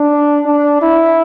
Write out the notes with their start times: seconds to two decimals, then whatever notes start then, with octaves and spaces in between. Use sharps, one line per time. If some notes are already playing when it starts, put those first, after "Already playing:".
Already playing: D4
0.46 D4
0.82 E4